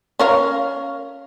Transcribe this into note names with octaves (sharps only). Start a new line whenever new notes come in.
C#4 A#4 F5